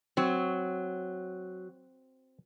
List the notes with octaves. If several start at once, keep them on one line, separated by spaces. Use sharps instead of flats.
F#3 C4